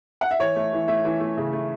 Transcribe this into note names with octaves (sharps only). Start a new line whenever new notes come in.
F#5
E5
E3 C#5
A3
E3
A3 E5
E3
A3
C#3
A3